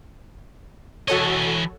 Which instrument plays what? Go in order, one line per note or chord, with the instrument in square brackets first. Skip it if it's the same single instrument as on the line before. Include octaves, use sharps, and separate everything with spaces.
[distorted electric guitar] E3 D#5 [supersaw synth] F#4 A4 C#5